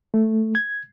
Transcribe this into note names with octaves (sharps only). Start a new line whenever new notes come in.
A3
G#6